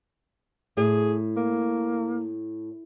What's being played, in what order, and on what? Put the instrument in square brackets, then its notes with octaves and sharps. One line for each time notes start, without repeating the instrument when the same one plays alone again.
[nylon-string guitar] A2 [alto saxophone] G#4
[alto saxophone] A#3